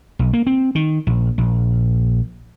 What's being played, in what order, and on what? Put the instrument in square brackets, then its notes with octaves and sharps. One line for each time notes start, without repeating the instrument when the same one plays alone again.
[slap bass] B1
A#3
C4
D#3
A#1
A#1